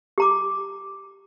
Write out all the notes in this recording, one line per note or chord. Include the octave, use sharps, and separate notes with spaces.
G4 A#5 D6